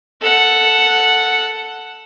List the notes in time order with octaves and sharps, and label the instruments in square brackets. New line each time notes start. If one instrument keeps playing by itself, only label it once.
[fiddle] A4 F#5